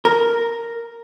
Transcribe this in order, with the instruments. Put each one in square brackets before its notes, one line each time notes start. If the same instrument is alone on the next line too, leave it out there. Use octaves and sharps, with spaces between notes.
[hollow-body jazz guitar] A#4